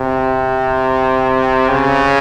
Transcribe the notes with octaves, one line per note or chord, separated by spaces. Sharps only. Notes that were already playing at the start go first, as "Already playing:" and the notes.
Already playing: C3
C#3